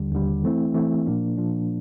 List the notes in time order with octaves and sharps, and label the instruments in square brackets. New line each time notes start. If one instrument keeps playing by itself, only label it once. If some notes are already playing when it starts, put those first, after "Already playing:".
Already playing: [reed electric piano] D#2 D3 G3
D#2 D3 G3
E3 A3 C4 E4
E3 A3 C4 E4
A#2 F3 A#3 D4
A#2 F3 A#3 D4